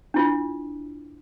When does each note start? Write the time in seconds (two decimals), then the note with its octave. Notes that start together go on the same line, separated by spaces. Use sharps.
0.14 D4 E4 F4